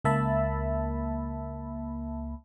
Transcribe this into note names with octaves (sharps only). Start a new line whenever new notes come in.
C#2 A#3 E5 A5 B5